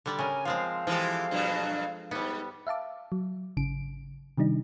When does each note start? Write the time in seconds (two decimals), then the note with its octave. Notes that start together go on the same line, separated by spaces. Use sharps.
0.06 D3 G3 D5
0.19 C#3 A#4 G#5
0.45 F3 G#3 C4 F5
0.87 E3 F3 G#3 G4 A4
1.31 G2 B2 F#3
2.11 G#2 G3 B3
2.67 E5 F5 A5 D6
3.12 F#3
3.57 G#1 C#3 D7
4.38 C3 D#3 G3 D4 D#4